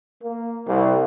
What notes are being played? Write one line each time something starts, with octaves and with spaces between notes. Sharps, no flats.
A#3
C2